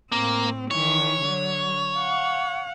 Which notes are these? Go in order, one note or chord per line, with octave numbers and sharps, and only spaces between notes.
A2 A#3 C4
D#3 E3 C#5
D3 F#3
F5 F#5